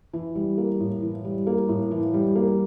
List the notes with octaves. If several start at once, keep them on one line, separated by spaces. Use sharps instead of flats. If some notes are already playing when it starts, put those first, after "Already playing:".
E3
G3
A#3
A2
E3
G3
A#3
A2
E3
G3
A#3